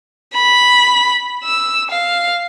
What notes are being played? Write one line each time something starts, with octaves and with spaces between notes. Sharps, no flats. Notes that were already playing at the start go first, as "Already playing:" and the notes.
B5
E6
F5